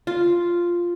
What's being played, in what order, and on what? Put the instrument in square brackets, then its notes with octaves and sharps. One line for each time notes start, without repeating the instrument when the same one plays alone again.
[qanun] F4